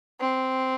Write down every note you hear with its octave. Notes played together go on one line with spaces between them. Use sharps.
C4